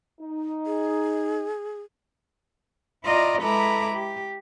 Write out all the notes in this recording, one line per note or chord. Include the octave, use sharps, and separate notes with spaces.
D#4
G#4
E4 F4 D5 D#5 A#5
G#3 E4 A4 B4 A#5 D6
G4